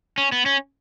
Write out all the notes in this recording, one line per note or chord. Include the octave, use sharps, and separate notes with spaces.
C#4
B3
C#4